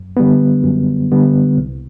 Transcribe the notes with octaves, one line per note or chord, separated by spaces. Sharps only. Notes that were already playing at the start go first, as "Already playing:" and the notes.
Already playing: F#2
D3 G3 B3
F#2
D3 G3 B3
C2